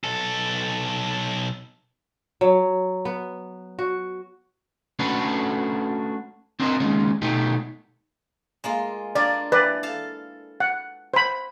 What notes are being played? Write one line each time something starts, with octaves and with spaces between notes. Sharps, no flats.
B1 A4
F#3
B3
F#4
A3 C#4 D4 F#4 A4 B4
C4 D4 E4 A#4 C5 D#5
D#2 G#3 C#4
B2 A3 D#4 G4
G#3 A#3 F4
A#3 D4 F4 D5
E3 B4 D5
A4 F5 A5
F#5
C5 B5